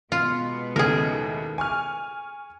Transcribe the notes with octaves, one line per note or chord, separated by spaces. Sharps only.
B2 G#3 B3 F4
D#2 A2 C#3 G#4 A#4
G#5 C#6 F6